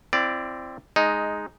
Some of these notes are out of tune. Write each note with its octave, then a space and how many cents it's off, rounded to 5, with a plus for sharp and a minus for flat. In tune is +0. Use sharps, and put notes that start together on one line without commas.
C4 +0 E4 +35 D5 +0
G#3 +5 D#4 +0